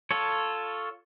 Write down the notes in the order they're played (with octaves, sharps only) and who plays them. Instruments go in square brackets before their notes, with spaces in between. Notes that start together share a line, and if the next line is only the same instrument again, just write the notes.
[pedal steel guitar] F4 A4 C#5